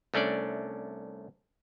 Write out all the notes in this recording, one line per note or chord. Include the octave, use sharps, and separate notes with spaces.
C2 A3 C#4 D4 D5